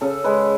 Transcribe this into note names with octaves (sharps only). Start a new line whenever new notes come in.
C#3 A4
G#3 B4